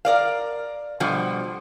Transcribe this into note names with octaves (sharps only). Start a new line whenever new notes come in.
A#4 D5 F5
B2 D3 F3 G3